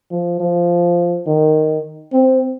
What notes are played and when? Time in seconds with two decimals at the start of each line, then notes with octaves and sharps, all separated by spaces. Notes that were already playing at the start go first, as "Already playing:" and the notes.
0.12 F3
0.40 F3
1.27 D#3
2.13 C4